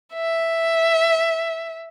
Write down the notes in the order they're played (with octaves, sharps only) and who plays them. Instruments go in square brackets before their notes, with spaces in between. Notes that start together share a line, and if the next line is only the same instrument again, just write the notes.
[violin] E5